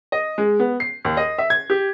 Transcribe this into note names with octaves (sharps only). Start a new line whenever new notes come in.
D#5
G#3
B3
C7
D#2
D#5
E5
G#6
G4